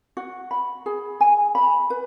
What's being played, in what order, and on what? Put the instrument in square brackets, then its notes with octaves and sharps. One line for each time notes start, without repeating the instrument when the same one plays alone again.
[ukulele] F#4
B5
G#4
G#5
B5
B4